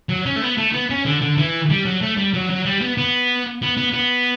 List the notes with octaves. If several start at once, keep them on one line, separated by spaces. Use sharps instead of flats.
F#3
C#4
A3
B3
A3
B3
C#4
D3
D3
E3
G3
F#3
A3
G3
F#3
F#3
G3
B3
B3
B3
B3
B3